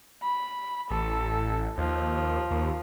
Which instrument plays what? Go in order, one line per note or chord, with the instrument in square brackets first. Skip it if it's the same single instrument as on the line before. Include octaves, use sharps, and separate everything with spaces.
[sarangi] B5
[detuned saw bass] A1 [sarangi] A4
[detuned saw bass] D#2 [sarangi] F3
[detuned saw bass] D#2